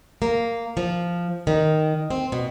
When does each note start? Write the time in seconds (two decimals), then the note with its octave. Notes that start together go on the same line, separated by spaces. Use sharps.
0.22 A#3
0.77 F3
1.47 D#3
2.10 C4
2.32 B2